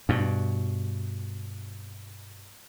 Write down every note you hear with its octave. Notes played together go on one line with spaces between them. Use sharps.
G2 B2